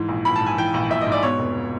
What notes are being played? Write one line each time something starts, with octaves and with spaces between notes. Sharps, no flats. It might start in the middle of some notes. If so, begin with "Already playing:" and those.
Already playing: G#2 E3
A#1
A#1 B5
A5
G#2
G#5
E3 G5
A#1
A#1 E5
D#5
G#2
D5
B2 C#5
F1